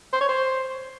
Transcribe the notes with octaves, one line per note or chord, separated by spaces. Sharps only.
C5
C#5
C5